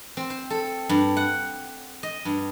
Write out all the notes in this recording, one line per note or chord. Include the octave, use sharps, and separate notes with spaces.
C4
C5
A4
G2
F#5
D#5
G2